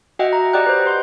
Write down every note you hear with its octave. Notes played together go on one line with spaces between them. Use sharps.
F#4 D#5 E5 F#5 G5
A#5
G4 D5 D#5 F#5 G5 F#6
B4 C5
B4 C6 G6